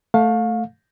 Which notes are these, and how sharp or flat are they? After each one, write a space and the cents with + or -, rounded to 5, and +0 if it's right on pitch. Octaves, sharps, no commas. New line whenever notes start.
A3 +5 F5 +25